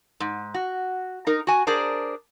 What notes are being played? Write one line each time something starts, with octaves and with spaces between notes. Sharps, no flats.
G#2
F#4
D#4 A#4
F#4 G#5
D4 G#4 A#4 C5 D5